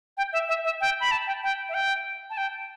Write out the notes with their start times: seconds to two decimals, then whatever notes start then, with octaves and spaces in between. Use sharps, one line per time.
0.17 G5
0.33 E5
0.48 E5
0.64 E5
0.81 G5
1.00 B5
1.11 A5
1.27 G5
1.43 G5
1.69 E5
1.74 G5
2.30 A5
2.37 G5